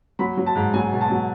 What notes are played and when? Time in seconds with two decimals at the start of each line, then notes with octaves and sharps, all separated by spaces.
0.19 F#3 B5
0.37 F#3
0.46 A5
0.56 G#2
0.74 F#3 G#5
0.92 B2
1.01 A5
1.10 F#3